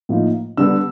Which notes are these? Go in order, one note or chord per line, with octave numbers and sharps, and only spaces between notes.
A2 F3 A#3 D#4
D3 G3 B3 E6